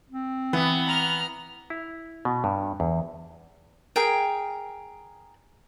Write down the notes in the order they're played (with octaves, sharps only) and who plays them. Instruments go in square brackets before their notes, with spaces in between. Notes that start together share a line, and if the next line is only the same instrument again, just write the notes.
[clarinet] C4
[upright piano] E3 [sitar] B3
[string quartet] A#5 F6
[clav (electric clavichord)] E4
B2
G2
E2
[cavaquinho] G#4 A#4 G5